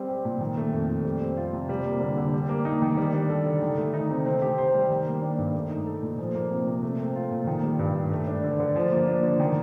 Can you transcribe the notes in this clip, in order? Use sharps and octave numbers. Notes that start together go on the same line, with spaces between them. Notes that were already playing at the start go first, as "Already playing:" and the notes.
Already playing: G3 C4
G4
A#2
D#3
A3
F2
F2
G3
C4
F4
C3
G3
A#3
D3
D3
G3
A#3
D#4
D#3
G3
D4
A4
D3
D#3
A3
D#4
C3
C4
G4
C5
G3
D#3
A#3
D4
G2
A3
D#4
A4
A#2
F3
A#3
C3
C3
A3
C4
F4
A#2
D#3
G3
G2
G2
A3
D4
D3
D3
F3
A#3
D4
D3
D#3